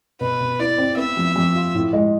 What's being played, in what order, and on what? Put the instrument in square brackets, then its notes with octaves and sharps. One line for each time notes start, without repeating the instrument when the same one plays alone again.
[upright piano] B2 [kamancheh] B4
[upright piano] B2
[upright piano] E4 [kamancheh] D5
[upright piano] C4
[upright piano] B3 [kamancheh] E5
[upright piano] F2
F2
F4
A2
G#3